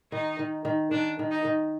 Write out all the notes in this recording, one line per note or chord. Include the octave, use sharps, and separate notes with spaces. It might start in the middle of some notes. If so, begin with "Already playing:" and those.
D#3 D#4
D#3
D#3
D#3 D4
D#3
D#4
D#3